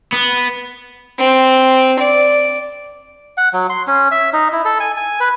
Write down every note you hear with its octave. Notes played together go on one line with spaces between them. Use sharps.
B3
C4
D5
F#5
F#3
C6
C#4
E5
D#4
E4
A4
G#5
G#5
B4